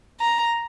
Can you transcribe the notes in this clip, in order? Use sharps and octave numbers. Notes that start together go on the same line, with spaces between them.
A#5